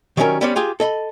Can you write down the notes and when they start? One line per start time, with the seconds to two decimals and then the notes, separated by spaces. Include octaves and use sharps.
0.17 D#3 F#3 G3 A3 C#4 A#4
0.41 G3 B3 C#4 C5 D5
0.56 F4 G4 G#4
0.80 A4 D#5 B5